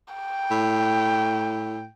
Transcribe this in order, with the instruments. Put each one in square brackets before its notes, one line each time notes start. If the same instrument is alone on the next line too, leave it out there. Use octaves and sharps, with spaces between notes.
[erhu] G5
[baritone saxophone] A2